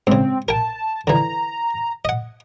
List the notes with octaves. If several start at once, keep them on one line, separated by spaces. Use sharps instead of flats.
G#2 C#3 C4
A#4 G5 A5
D3 E3 A#5
D#5 F#5